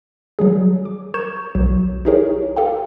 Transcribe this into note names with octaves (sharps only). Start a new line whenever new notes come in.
F#3 G3 G#4
D6
A#4 C#6 G6 G#6 E7
B1 F#3
D#4 E4 G4 G#4 A#4 C#5
G4 A4 F5 G5